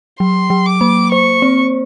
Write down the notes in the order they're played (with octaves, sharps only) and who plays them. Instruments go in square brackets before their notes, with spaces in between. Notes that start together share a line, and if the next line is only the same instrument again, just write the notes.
[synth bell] F#3 [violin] C6
[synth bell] F#3
[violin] D6
[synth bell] A#3
[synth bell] C5 [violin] C#6
[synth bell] C4